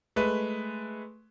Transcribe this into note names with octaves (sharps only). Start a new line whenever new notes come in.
G#3 A3 B4